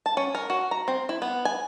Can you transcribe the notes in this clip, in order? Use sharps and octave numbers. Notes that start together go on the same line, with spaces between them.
A5
C#4
A#4
F#4
A#5
C4
E4
B3
G#5